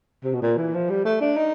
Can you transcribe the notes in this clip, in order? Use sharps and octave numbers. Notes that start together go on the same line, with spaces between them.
C3
B2
A#2
E3
F3
G3
A3
D4
D#4